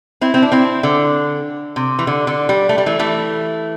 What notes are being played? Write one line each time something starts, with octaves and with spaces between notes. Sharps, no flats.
C4 E4
C4
D4
C4 E4
D3
C3
E3
D3
D3
G3
A3
G3
E3 A3
E3 A3